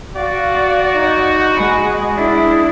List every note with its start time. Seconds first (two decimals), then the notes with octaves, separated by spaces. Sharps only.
0.16 F#4 D5 F5
0.94 D#4
1.55 G#3 B5
2.16 D4 E4 G#4